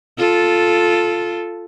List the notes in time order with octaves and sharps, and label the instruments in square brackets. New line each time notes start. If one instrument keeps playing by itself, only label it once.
[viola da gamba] F4 A4